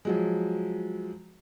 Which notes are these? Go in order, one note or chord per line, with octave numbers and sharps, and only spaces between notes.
F3 F#3 G#3